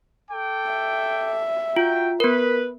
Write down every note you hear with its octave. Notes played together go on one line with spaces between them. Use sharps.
A4 G5 D6
E5
F4 F#4 G5
B3 A#4 B4